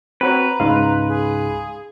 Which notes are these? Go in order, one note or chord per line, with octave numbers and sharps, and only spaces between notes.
C4 F#4 B4 C#5 A#5
C#2 G#2 F5 C6
G#4